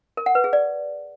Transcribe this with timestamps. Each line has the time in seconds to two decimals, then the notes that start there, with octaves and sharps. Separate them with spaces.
0.17 A#4
0.26 F#5
0.35 B4
0.44 G#4
0.53 D5